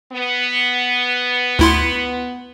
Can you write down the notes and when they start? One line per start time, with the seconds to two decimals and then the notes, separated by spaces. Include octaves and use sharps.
0.13 B3
1.59 D2 E4 C6